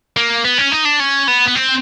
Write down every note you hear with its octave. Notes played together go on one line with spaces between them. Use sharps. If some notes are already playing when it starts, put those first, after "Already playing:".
A#3
B3
C#4
D#4
D4
C#4
B3
B3
C4